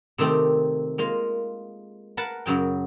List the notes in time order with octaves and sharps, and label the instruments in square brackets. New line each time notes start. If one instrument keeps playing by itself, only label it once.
[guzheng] C3 D#3 A3 C4 G4
G#3 A#3 F4
A#4 B4 F#5 A5
F#2 C#3 F#3 G5